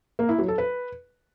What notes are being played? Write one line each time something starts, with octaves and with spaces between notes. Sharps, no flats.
A#3
E4
F#3
A4
B4